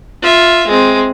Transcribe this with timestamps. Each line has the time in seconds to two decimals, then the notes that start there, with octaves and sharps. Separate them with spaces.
0.22 F4 E5
0.67 G#3 C4